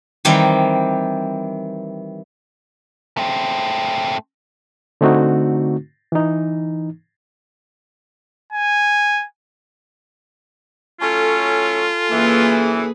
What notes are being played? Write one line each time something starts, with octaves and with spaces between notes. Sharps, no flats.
D#3 E3 G3 C4
A3 C4
D3 A3 C4 D#4 F#4
E3 D#4
G#5
F#3 A3 C#4 F4 A4 G#5 A5
F#2 E3 A#3 G#4 B4